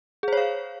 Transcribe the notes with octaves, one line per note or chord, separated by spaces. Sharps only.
G#4 C5 C#5 F5